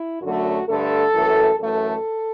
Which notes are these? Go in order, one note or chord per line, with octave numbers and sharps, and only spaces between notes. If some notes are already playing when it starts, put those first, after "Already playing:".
Already playing: E4
F#2 D3 F#3 A3 F#4
G2 D3 A3 A4
F#2 E3 A3
F#2 E3 A3 A4